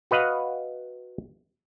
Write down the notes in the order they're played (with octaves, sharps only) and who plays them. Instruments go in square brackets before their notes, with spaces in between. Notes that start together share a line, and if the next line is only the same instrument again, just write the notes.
[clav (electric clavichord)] F#4 B4 D#5 F5 F#5